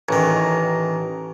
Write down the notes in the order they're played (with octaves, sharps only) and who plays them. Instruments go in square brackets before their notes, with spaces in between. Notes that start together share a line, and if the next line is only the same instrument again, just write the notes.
[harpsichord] A1 D#3